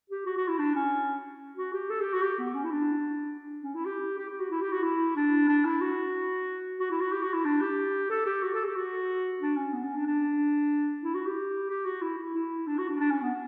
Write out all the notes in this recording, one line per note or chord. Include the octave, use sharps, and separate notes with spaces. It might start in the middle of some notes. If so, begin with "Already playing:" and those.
G4
F#4
F#4
E4
D4
C#4
F#4
G4
A4
G4
F#4
G4
B3
C#4
E4
D4
C#4
E4
G4
G4
G4
F#4
E4
G4
F#4
E4
D4
D4
E4
F#4
F#4
E4
F#4
G4
F#4
E4
D4
G4
A4
G4
F#4
A4
G4
F#4
D4
C#4
B3
C#4
D4
D4
E4
F#4
G4
G4
F#4
E4
E4
E4
D4
F#4
D4
D4
C#4
B3